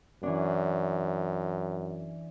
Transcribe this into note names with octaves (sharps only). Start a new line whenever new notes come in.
F#2 E3 C#4 D4